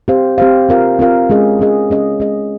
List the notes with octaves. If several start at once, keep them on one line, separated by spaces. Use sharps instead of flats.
C4 G4 C5 F5
C4 G4 C5 F5
C4 F4 A#4 F5
C4 F4 A#4 F5
G#3 C#4 G#4 D#5
G#3 C#4 G#4 D#5
G#3 C#4 G#4 D#5
G#3 C#4 G#4 D#5